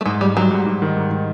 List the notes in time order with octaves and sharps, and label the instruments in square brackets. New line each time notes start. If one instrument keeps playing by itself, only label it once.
[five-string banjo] A3
[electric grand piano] G#2 [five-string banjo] G#3
[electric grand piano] G#2 [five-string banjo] G3
[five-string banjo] F#3 [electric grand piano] G3
[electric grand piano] G#2
G#2
D#3
G#2
D#3